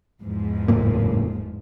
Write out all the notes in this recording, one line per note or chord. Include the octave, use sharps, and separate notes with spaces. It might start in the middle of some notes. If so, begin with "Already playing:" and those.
E2 G#2 F3
F#1 A2 A#3